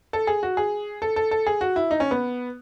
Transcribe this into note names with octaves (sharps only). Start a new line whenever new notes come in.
A4
G#4
F#4
G#4
A4
A4
A4
G#4
F#4
E4
D#4
C#4
B3